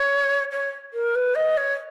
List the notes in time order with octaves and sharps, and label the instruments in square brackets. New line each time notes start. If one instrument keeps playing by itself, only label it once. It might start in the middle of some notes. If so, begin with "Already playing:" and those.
Already playing: [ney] C#5
C#5
A#4
B4
D#5
C#5